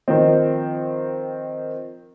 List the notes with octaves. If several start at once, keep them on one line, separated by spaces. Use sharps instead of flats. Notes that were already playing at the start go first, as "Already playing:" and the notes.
D#3 F3 C4